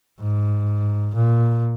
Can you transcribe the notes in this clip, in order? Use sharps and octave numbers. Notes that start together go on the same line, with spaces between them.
G#2
A#2